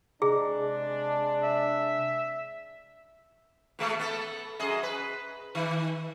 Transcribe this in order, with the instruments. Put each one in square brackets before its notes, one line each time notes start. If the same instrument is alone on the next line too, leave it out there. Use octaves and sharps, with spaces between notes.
[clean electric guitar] C3 D#5 A#5 [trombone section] G#3 D4 [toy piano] G#4
[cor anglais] E5
[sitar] B2 G#3 A3
B3 A4
F#2 G#4 D#5
B4
D#3